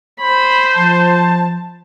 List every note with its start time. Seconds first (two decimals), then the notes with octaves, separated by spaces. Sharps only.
0.21 C5 B5
0.76 F3 A5